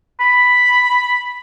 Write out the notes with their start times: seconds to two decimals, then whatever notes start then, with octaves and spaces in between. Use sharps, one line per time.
0.21 B5